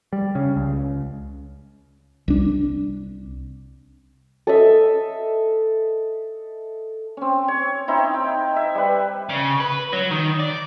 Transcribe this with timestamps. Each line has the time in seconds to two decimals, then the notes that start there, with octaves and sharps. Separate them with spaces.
0.13 G3
0.35 C#3
0.56 C#2
2.28 C2 D4
4.47 A4 D#5 E5
7.17 C4 C#4
7.48 C#5
7.88 C4 D#4 E4
8.14 G5
8.56 E5
8.75 G3 B4
9.29 C#3
9.60 B4
9.93 F#3
10.11 D#3
10.40 D5